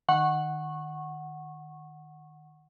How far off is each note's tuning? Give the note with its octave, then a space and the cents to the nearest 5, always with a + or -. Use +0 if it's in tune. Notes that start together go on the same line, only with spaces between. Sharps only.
D#3 -20 F#5 +0 C#6 -20